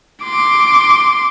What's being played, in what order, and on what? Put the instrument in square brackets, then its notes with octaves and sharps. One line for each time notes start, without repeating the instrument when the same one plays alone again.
[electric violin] C6 D6